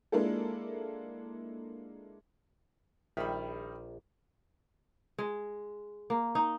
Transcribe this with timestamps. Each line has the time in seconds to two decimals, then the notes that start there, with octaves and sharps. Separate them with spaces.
0.12 G#3 A#3 D4 E4 F4 A4
3.17 A#1 D#3 G3 E5 B5
5.19 G#3
6.10 A#3
6.35 D#4